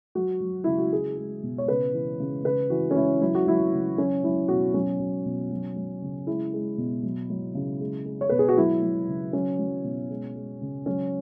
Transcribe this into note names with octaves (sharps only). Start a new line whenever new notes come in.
F#3 F#4
F#3
C#3 E4
F#4
G#3 G#4
G#3
B2
C#5
C#3 B4
E3
C#3
C#3 B4
E3 F#4
C#4
C#3 E4
F#3 E4
F#4
F#3 E4
C#3
F#3 C#4
F#3 E4
B2 F#4
F#3 C#4
F#3
B2
F#3
F#3
C#3
G#3 E4
G#3
B2
F#3
F#3
C#3
G#3
G#3
C#5
B2 B4
G#4
F#4
F#3 E4
F#3
C#3
F#3 C#4
F#3
B2
G#3
G#3
C#3
F#3 C#4